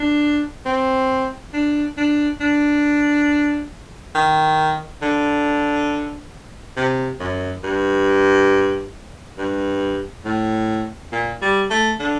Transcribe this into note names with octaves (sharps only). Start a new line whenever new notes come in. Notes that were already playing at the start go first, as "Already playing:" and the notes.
Already playing: D4
C4
D4
D4
D4
D#3
D3
C3
F#2
G2
G2
A2
A#2
G3
A3
D3